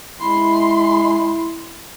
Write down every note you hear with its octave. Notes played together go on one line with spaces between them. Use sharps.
G#3 E4 B5 C6